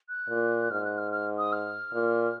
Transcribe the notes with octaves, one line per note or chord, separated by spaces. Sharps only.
F#6
A#2
G#2 F6
F#6
F6
F6
D#6
F6
A#2